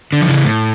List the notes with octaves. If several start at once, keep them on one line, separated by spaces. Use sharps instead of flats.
D3
F3
C#3 E3
A2